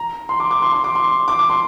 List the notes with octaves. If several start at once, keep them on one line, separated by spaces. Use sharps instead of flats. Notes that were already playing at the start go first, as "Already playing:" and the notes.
Already playing: A#5
C6
D6
D6
C6
C6
D6
C6
D6
D6
C6